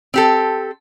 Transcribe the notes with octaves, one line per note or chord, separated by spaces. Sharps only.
C4 G4 A4